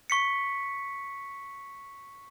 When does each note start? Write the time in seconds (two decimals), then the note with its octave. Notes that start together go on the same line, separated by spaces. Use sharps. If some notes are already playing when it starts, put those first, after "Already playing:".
0.10 C#6 B6 C#7